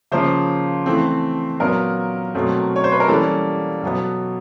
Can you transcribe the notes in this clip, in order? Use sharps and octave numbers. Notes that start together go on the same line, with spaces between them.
C#3 F3 A#3 C5
E3 A3 C4
A#2 F#3 B3 A#4
B2 F#3 A3 C4
C#5
C5
B4
A#4
E3 G3 A#3 C#4 A4
B2 F#3 B3